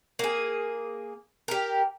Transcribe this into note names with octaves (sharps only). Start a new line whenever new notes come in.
A#3 G#4
G4 A#4